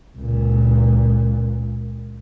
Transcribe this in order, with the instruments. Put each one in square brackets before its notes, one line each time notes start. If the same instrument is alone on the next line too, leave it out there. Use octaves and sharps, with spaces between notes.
[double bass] C#2 A#2